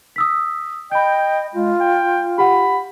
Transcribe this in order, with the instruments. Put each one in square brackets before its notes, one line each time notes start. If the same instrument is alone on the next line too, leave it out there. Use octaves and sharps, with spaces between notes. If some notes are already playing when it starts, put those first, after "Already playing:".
[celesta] D#6 E6 B6
[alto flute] D#5 [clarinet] G5 [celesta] B5 G6
[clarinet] G#3 [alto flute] F4
[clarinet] G5
[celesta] G4 F#5 [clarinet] B5